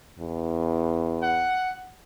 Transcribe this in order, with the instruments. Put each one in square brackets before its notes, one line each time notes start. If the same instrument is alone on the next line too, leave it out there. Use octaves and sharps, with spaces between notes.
[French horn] E2
[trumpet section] F#5